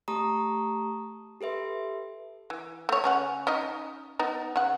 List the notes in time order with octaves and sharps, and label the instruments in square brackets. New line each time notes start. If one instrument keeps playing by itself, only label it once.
[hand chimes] A3 G4 A5 A#5 C#6 D#6
G4 A4 B4 E5 C6
[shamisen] E3
A3 C#5
C#3 C#4 F#5
C#4 D#4 D#5
B3 D#4
C#3 F#5